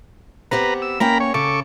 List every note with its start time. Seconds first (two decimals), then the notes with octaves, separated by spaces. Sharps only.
0.51 B3 C4 G4 B4 A#5
0.82 E6
1.00 A#3 C#4 A#4 G5 A#5 B5
1.20 C#5
1.34 C#3 A4 C#6 D6